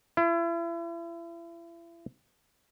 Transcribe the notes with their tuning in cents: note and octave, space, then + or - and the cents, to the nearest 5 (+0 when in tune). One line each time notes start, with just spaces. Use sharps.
E4 +40